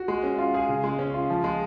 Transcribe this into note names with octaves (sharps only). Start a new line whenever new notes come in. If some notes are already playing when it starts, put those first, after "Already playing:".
Already playing: F#4
G#3
C#4
F4
G#4
C#3
G#3
C#4
F4
F3
G#3